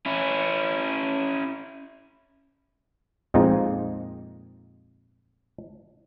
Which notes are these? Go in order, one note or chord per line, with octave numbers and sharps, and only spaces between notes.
C#4 E4
F2 A#2 G#3 C4 D#4 F4